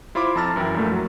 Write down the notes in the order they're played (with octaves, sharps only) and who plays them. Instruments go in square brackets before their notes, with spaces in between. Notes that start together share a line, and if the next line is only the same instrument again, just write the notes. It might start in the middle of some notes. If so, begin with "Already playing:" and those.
[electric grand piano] E4 F4 C5 B5 D6
F2 A5 A#5 E6 F6 A6
F#2 E3 E4 A#4 G5
A#1 F#2 A3 A#3
F#3